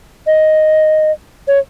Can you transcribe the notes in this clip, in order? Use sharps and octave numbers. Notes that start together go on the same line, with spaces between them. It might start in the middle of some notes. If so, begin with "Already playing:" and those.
D#5
C#5